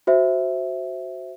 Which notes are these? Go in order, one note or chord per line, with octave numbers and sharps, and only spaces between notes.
F#4 C5 E5